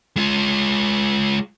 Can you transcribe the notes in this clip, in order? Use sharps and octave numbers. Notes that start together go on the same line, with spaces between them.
G#3 F4